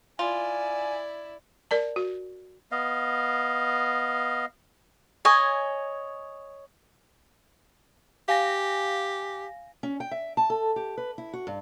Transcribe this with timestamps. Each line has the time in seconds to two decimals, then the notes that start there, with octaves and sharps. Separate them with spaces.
0.19 E4 F4 D5 G#5
1.71 A#4 D5 A5
1.96 F#4
2.72 B3 D#5 F5
5.25 C#5 D#5 G#5
8.28 G4 F5 G#5 A#6
9.83 C#4
10.00 G5
10.11 E5
10.37 A5
10.50 A4
10.76 G4
10.98 B4
11.18 E4
11.33 F#4
11.47 G2